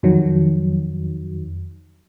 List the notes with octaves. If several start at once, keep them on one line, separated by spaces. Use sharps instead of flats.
F2 D#3 F#3